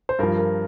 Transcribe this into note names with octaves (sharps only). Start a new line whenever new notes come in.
C5
G2 F3 A#4
A#4